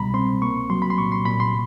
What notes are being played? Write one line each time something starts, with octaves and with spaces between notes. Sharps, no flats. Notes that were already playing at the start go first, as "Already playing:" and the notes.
Already playing: C2 B2 G3 A#5 B5
C4 C6
A#3 C#6
F#3 C6
B5
C6
A#2 C#6
C6
A#2 B5
C6